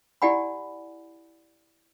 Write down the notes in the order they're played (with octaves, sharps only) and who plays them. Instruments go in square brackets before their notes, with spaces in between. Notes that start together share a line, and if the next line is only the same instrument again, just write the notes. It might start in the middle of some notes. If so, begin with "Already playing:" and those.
[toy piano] E4 G4 D5 F#5 G#5 B5